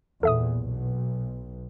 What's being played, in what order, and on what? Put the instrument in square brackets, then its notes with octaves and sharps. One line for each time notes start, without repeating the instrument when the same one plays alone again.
[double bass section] E2 A#2 [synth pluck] A4 E5 D#6
[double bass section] B1